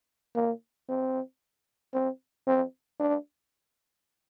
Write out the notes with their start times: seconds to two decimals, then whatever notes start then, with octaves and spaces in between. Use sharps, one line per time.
0.35 A#3
0.89 C4
1.93 C4
2.47 C4
3.00 D4